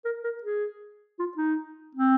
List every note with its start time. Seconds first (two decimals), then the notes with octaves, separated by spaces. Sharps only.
0.05 A#4
0.23 A#4
0.43 G#4
1.19 F4
1.37 D#4
1.95 C4